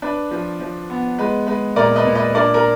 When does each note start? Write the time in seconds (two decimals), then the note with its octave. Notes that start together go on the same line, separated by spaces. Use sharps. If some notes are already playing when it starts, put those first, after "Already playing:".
0.02 D4 B4
0.31 F3
0.60 F3
0.90 B3
1.18 G#3 B4
1.47 G#3 B4
1.76 A#2 A#4 D5
1.96 B4 D#5
2.05 A#2
2.15 B4 D#5
2.34 D4 A#4 D5
2.54 A#4